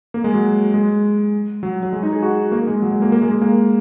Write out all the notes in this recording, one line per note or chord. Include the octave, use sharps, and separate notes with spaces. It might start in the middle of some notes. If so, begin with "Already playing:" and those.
A#3
G#3
F#3
G#3
F#3
F#3
G#3
D#4
G#4
F#4
A#3
G#3
F#3
G#3
A#3
A#3
G#3
G#3
A#3